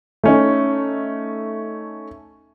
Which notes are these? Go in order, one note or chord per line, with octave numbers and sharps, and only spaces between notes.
A3 C#4 D#4